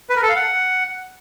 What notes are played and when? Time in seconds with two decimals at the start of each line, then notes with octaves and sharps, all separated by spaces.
0.09 B4
0.16 A#4
0.23 A4
0.29 F5
0.36 F#5